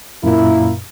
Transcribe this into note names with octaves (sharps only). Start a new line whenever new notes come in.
F#2 A#2 A#3 E4